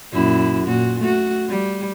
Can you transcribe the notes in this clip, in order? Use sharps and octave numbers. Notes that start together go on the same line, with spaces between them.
F#2 A#2 E4
A#2 F#4
A3 F#4
G3